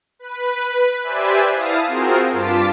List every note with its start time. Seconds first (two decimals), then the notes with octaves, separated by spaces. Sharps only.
0.19 B4
1.03 G4 B4 C5 D5 E5 G#5
1.54 E4 F5 A5 D#6 C7
1.87 C4 F4 F#4 G#4 A#4 C5
2.32 G2 F4 A5 D6 B6